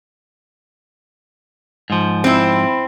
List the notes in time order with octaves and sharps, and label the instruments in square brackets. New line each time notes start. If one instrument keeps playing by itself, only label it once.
[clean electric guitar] G#2 F3
[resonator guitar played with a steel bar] C4 E4